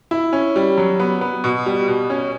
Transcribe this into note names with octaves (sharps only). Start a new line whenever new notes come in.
E4
C#4
G3
F#3
B3
B3
B2
G3
B2
C#4